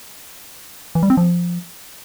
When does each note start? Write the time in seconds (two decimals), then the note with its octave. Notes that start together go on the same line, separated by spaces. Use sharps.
0.95 E3
1.03 G3
1.10 C4
1.17 F3